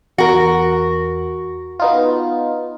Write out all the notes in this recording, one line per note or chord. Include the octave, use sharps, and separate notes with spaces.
E2 F#4 A#4
B3 D#4 F4